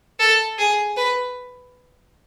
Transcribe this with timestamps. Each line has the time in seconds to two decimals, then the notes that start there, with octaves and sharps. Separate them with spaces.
0.19 A4
0.59 G#4
0.97 B4